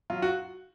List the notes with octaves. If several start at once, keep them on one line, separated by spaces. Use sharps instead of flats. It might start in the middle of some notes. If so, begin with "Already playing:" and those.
F#3 F4
F#4